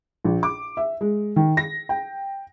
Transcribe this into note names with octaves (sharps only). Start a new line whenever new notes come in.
A#1
D6
E5
G#3
D#3
A#6
G5